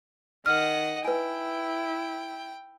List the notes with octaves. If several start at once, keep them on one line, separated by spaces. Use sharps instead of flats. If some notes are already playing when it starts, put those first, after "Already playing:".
D#3 D#5 F#5 F6
E4 B4 G5 G#5